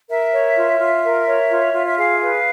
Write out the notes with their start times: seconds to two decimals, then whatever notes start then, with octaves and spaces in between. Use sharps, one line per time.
0.09 A#4 E5
0.33 C#5
0.56 F4
0.80 F4
1.03 A#4
1.27 C#5
1.51 F4
1.74 F4
1.87 E5
1.97 G#4 F5
2.21 B4